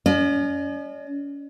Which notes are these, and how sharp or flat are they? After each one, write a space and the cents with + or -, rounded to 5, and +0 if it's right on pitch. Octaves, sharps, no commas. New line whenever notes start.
C#4 +35 D#5 -40